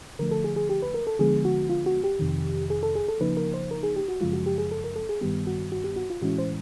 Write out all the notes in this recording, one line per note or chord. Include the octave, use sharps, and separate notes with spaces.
D3 F3 A3 A#4
A4
G#4
G#4
G4
B4
A#4
A4
D3 F3 G#3 B3 G#4
F#4
F4
F#4
G4
F2 C3 D#3
G#4
A4
G#4
A4
C#3 F3 A#3 D#4 B4
A#4
C5
A#4
G#4
G4
F#4
F#2 C#3 F3 G#3 F4
F#4
G4
G#4
A4
A#4
A4
G#4
G2 D#3 G3 B3 G4
F#4
F#4
G4
F#4
F4
A2 E3 G#3 C#4 E4 F#4
C5